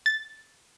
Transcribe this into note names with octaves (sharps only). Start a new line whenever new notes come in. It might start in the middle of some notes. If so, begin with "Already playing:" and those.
A6